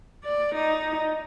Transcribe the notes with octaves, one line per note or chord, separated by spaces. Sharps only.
D5
D#4